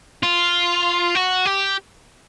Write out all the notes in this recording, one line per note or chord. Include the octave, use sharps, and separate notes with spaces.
F4
F#4
G4